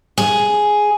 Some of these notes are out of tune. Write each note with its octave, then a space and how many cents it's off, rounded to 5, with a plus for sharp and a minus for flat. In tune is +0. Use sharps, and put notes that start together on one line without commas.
G#4 +5